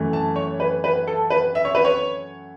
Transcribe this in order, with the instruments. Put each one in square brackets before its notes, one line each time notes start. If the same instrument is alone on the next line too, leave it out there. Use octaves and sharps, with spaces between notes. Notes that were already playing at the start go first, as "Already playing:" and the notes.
Already playing: [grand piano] F#2 E3 A3
A5
C#5
B4
B4
A4
B4
E5
C#5
B4
C#5